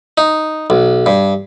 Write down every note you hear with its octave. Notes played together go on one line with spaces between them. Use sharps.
D#4
B1
G2